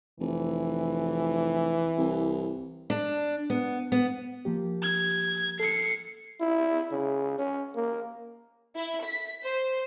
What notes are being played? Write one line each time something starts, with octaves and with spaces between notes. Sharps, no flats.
F1 E3
C2
D4
B3
B3
F3 A#3 G4
G#6
A4 C7 C#7
E4
C#3
C#4
A#3
E4
B6
C5